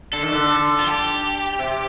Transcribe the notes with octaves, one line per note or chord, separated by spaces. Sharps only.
D3 A4
D#3
D3
F4
G4
C3